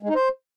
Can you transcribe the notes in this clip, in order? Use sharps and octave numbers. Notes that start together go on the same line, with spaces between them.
G#3
D#4
C5